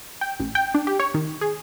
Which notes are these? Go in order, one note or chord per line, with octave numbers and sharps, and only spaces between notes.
G5
A1
G5
D4
G4
C#5
D#3
G#4